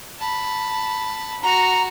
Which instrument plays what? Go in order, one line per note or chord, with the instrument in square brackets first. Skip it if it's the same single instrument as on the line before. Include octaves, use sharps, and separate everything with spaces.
[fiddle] A5 B5
[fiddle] F#4 [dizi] A#5